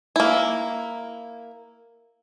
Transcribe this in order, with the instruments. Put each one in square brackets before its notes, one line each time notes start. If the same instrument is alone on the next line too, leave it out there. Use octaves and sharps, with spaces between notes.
[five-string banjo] A#3 E4